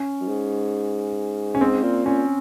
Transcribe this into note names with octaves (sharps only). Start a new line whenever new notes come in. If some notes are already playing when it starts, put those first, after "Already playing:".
Already playing: C#4
F#2
G#2
C#4
G#2 C4
A#2
A#2 C#4